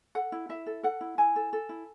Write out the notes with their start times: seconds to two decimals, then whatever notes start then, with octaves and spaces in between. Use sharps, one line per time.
0.15 A4 F#5
0.32 E4
0.49 E4 E5
0.66 A4
0.83 A4 F#5
1.01 E4
1.18 E4 G#5
1.36 A4
1.53 A4
1.69 E4